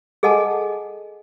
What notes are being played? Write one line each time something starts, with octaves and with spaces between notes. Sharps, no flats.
G#4 A4 D#5 F#5 G#5 A5